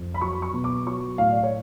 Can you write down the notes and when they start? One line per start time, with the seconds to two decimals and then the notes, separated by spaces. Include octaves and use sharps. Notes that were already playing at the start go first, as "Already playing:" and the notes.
Already playing: F2
0.14 B5
0.21 F#3 C#6
0.42 C#6
0.53 B2
0.64 D6
0.87 F#3 C#6
1.18 A2 F5
1.32 D5
1.43 C#5